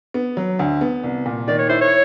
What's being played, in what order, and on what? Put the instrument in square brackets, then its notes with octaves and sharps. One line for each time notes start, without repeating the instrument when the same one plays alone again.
[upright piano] B3
F#3
D2
B3
C2
A#2
[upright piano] D#3 [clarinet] D5
[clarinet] C#5
[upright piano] E4 [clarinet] C5
[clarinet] C#5